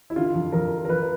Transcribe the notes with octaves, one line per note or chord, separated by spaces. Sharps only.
E4
D3 F4
F2
F2 A#4
F2
A#4
F2 B4